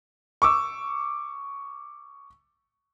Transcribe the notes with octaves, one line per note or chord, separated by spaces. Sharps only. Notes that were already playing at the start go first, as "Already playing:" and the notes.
C#6 D6 E6